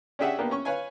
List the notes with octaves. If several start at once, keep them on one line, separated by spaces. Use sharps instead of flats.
C#4 D4 G4 G#4 E5 F#5
A#3 B3 D4 G4
C#4 C#6
B4 C#5 F5 G#5